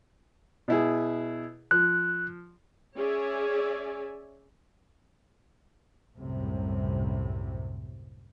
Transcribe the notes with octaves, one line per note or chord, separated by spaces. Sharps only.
B2 E4 G#4
F3 F#6
C#4 G#4 C#5 D5 E5 G#5
C2 F#2 A2 C3